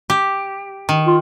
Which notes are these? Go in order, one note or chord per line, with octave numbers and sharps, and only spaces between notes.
G4
D#3
F4